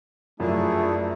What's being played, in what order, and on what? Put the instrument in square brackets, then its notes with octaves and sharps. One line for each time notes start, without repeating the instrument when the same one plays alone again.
[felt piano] F#2 [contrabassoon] F3 [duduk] A3 [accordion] D4 E4 G#4